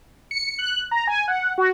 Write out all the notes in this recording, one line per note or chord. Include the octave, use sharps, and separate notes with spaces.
C#7
F#6
A#5
G#5
F#5
F#4